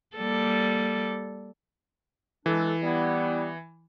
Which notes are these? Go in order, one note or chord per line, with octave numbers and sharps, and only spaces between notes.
G3 A#3 A4
E3 G#3 D4 A4
G3 B3 E4